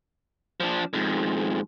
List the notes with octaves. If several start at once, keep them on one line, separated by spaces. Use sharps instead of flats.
F3 D4
F2 G#2